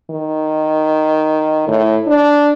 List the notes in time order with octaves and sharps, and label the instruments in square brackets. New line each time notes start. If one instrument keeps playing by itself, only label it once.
[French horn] D#3
A2
D4